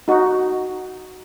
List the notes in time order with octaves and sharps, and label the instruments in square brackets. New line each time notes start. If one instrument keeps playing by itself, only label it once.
[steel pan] D#4 F#4